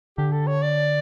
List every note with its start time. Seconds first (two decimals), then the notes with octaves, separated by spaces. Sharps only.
0.17 D3 G4
0.32 A4
0.47 C#5
0.63 D5